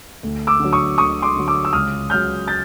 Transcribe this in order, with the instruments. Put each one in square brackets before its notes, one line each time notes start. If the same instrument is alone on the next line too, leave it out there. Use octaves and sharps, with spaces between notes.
[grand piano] D2
D6 E6
D3 F#3
C#6 D#6
D2 C#6 D#6
C6 D6
D3 F#3
D6 E6
E6
C#2 D#6 F6
C#3 F#3 F6 G6
G6 A6